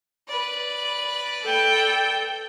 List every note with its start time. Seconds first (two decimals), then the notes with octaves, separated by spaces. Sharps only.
0.28 B4 D5
1.43 A4 G5